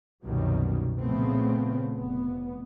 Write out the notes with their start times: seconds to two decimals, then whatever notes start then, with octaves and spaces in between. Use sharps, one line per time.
0.23 C2 F#2 B2 D#3 F#3 G3
0.97 A#2 C#3 F3 A3 B3 C4
1.94 F1 B3